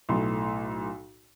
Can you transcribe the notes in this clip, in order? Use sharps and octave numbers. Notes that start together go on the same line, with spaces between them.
B1 A2 A3 C6